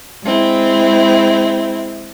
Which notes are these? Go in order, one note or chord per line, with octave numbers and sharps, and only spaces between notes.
G#3 C4 E4